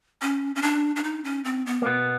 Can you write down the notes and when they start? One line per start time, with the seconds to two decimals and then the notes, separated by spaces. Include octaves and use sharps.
0.22 C#4
0.55 C#4
0.62 D4
0.96 D4
1.03 D#4
1.24 C#4
1.44 C4
1.66 B3
1.82 A#3
1.86 B2 B3